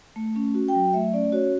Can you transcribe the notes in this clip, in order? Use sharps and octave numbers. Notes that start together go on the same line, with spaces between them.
A3
C#4
F#4
G5
F#3
A3 E5
C#4 D5
F#4 C#5